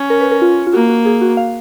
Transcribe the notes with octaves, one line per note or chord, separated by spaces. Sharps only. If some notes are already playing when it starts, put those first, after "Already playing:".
Already playing: C#4
A#4
B4
A#4
F4
F4
A#3 F#4
F#4
G#4
F#4
F5